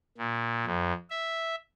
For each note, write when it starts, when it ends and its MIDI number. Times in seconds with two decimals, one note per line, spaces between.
0.18 0.65 46
0.66 0.93 41
1.10 1.55 76